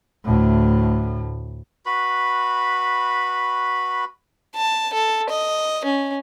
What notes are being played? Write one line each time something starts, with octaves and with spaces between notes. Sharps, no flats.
D2 A2
F#4 B4 B5
A5
A4
D#5
C#4